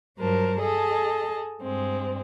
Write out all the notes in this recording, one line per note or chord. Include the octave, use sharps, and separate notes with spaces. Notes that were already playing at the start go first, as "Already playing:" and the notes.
G2 F#3 A#4 C5 A5
G#4 A4 D#5 A5
G2 G#3 C4